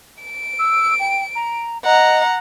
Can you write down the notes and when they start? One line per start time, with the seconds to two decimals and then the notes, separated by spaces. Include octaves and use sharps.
0.23 D7
0.59 E6
1.00 G5
1.35 A#5
1.85 D#5 F#5 A#5